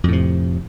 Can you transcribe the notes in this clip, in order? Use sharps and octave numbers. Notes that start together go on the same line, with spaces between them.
F2 A2 C3